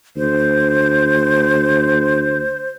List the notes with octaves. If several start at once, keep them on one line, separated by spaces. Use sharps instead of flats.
D2 C5